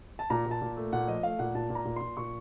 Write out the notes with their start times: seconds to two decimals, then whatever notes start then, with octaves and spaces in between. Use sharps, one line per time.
0.19 A5
0.30 A#2 A#5
0.46 A#2
0.51 A5
0.62 A#2
0.77 A3
0.93 A#2 F#5
1.08 F3 D#5
1.23 A3 F5
1.39 A#2 F#5
1.55 A#2 A5
1.70 A#2
1.75 A#5
1.85 A#2
1.96 A#2 C6
2.17 A#2 C#6